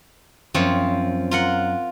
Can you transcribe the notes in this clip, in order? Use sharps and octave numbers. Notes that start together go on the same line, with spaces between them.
F#2 F3 C4 C#5
F4 A#4 F#5